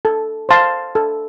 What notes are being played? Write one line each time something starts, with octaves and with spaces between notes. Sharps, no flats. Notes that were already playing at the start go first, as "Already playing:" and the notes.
A4
C5 F5 A5 C6
A4